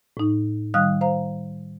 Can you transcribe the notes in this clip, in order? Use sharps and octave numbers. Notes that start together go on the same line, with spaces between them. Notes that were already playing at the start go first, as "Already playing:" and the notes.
A2 D#4
D#3 G3 F5 D#6 F6 F#6
C5 F5 A#5